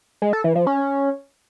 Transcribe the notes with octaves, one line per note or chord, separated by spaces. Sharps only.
G#3
A4
E3
F3
C#4